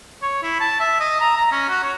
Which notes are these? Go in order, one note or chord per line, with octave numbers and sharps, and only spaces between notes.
C#5
E4
A5
E5
D#5
A#5
A#5
C#4
F#4
C#5